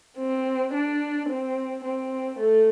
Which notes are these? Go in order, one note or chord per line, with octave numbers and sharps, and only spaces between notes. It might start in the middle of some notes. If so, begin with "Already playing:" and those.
C4
D4
C4
C4
A3